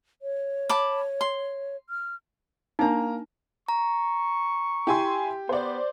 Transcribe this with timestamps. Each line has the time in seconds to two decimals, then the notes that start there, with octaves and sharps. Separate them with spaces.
0.22 C#5
0.69 A5 B5 D6
1.21 C6
1.90 F6
2.79 A#3 D4 D#4 A#5
3.68 A#5 C#6
4.87 E4 G4 G#5 C6
5.49 B3 C5 D5